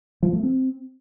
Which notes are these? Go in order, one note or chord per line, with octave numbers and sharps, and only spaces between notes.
F3
A3
C4